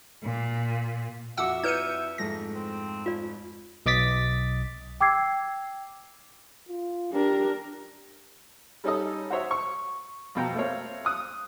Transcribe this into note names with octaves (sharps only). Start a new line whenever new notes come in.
A#2
F2 F#4 E5 F#5 D6 E6 C#7
E4 B4 D5 G6 C#7 D#7
F2 G#2 A3 A#6
C4
F4 D5
B1 D#5 D6 A6 B6
G5 D6 E6 G#6 C7
F4
D4 G4 A#4
G3 C#4 D#4 A4 D#5
F#4 C5 C#5 E5
C#6
F2 B2 G5 A#5
A3 A#3 C4 C#5
D#6 F#6